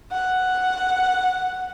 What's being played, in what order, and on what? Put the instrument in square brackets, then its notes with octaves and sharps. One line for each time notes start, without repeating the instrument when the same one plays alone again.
[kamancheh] F#5